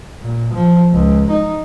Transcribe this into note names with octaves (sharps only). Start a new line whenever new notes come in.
A#2
F3
C#2
D#4